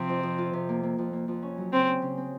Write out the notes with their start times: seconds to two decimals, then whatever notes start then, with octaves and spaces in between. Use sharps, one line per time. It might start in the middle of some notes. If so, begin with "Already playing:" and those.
Already playing: C3 F3 C4
0.09 F2
0.23 F2
0.38 F4
0.53 C3
0.69 A#3
0.83 A#3
0.98 F2
1.13 A#3
1.28 F2
1.43 C#4
1.58 F#3
1.73 C#3 C4
1.88 C#4
2.02 C#3
2.17 C4